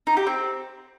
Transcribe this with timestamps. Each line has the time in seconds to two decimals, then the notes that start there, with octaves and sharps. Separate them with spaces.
0.07 D#4
0.17 G4
0.27 C4